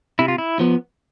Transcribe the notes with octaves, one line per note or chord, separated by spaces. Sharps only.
C3 E4
F4
E4
F3 B3